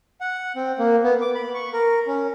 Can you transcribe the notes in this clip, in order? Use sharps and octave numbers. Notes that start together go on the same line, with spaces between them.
F#5
C4
A#3
B3
D6
B5
C#6
A#4
C#4